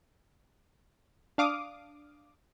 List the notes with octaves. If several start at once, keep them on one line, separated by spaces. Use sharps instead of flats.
D4 F5 D6 D#6